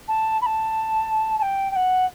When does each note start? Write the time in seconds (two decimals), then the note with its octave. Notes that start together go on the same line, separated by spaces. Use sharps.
0.08 A5
0.42 B5
0.46 A5
1.38 A5
1.42 G5
1.71 G5
1.76 F#5